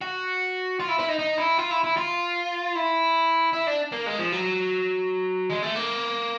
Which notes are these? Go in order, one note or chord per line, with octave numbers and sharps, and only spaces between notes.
F#4
F4
E4
E4
D#4
D#4
E4
F4
E4
E4
F4
E4
E4
D4
A#3
G#3
F3
F#3
G#3
A3
A#3